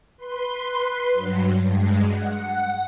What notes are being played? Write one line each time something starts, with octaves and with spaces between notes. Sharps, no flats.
B4 C6
G2 F#3
G2 G#3
F#5